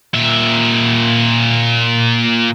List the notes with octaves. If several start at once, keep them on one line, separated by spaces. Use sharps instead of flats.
A#2 E5